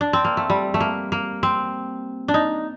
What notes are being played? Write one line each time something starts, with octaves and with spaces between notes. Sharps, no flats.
D4
C4
A#3
A3
G3
A3
A#3
A#3
C4
D4
D#4